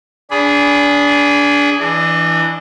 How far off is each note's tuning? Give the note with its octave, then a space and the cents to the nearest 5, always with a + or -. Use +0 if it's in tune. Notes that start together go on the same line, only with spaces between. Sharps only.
D4 -25 G#4 +0 B5 +0
E3 +0 D4 +0 D#5 -45